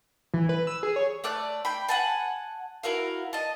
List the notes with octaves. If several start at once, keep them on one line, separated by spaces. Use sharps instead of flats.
E3
B4
E6
G#4
C#5
A3 D5 F#6
G5 B5
F#5 G#5 A5
E4 F#4 A#4 F5
D#5 A5